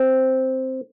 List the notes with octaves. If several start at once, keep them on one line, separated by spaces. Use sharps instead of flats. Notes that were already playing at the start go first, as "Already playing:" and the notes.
Already playing: C4